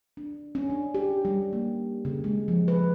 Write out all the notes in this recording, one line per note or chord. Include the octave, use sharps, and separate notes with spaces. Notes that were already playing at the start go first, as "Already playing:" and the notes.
D4
C#4
D4
G4
G3
A#3
C#3
G#3
F3
B4